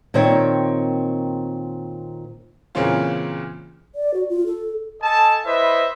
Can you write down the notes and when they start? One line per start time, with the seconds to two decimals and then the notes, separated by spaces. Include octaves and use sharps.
0.14 A#2 D#3 A#3 C4 C#5 G5
2.75 A#2 C#3 E3 C4 C#4 F4
3.95 D5
4.14 F#4
4.29 F4
4.46 A4
5.02 A4 D#5 G#5 A5
5.45 E4 B4 C5 D#5 E5